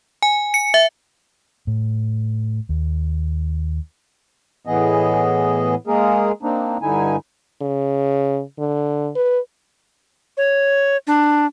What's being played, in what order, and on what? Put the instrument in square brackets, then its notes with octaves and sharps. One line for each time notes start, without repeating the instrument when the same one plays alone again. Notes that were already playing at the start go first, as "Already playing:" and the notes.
[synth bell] G#5
C#7
E5
[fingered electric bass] A2
D#2
[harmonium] A2 E3 B3 G#4 D#5
G#3 A#3 G#4 A#4
A#3 C4 D4 D#4
G2 D3 D#4 E4 G#5
[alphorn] C#3
D3
B4
[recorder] C#5
D4